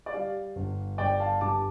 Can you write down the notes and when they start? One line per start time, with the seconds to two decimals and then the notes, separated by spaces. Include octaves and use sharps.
0.06 D5
0.14 G3 F5
0.56 G1
0.98 G1 D5 G5
1.20 F5 A5
1.41 G2 A5 D6